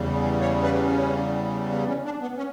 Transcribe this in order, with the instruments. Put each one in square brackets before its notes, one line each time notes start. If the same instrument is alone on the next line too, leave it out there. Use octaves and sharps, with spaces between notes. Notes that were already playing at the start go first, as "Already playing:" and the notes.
Already playing: [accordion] E2 C#3 G3
C#5
B4
C#4
B3
C#4
D4
B3
C#4